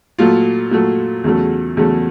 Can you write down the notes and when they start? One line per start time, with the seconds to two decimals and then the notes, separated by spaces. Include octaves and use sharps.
0.19 A#2 F#3 A3 F4
0.71 A#2 F#3 A3
1.24 E2 C#3 F#3 A3
1.77 E2 C#3 F#3 A3